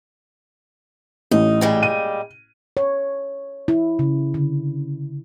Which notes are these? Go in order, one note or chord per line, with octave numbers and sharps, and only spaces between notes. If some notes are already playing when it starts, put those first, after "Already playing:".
A1 A2 D#4
A#2 G3 G#3
D#7
C#5
E4
C#3
D3